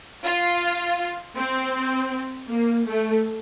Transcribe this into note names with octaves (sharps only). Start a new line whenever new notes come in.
F4
C4
A#3
A3